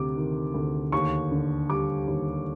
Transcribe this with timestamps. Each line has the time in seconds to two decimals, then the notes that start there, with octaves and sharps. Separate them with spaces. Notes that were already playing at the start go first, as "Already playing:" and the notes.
Already playing: D2 C3 D6
0.17 D#3
0.54 D2
0.92 D#2 C#6
1.31 D3
1.69 G3 D6
2.07 D#2